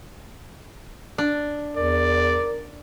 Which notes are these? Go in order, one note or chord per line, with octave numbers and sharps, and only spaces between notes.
D4
E2 A#4 D5